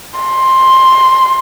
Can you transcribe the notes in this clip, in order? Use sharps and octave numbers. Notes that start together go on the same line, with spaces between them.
C6